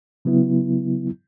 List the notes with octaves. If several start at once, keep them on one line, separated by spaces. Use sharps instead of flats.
C#3 F#3 B3 E4